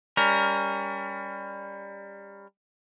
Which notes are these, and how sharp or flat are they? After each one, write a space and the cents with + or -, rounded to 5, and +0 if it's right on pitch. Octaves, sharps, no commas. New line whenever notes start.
G3 +25 C#4 +25 A#4 +0